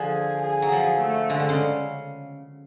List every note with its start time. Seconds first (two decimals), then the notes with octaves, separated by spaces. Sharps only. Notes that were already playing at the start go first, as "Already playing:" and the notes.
Already playing: D3 F3 G#4
0.42 G#4
0.62 F#3
0.72 F3
1.00 A3
1.30 D3 G#3
1.40 D3
1.49 C#3